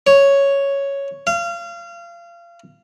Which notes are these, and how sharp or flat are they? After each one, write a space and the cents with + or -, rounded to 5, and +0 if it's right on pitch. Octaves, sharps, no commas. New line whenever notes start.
C#5 +0
F5 -30